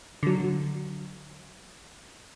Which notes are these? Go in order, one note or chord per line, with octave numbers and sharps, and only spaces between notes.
D3 F#3